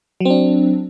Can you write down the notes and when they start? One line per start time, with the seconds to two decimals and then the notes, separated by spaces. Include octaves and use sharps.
0.20 F#3
0.25 C4
0.30 D4